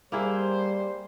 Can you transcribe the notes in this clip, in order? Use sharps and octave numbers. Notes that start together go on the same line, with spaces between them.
G3 A#3 E4 G#4 C5